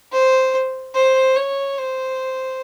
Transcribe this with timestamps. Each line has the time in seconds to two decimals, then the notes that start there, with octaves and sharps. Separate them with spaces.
0.12 C5
0.95 C5
1.36 C#5
1.79 C5